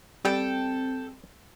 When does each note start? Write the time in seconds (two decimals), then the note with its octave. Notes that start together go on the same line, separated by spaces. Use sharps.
0.25 G3 C4 A4 G5